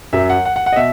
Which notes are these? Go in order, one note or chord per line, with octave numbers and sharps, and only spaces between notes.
F#2 F#3 E5
F#5
F#5
F#5
F#5
D#5
B2 E5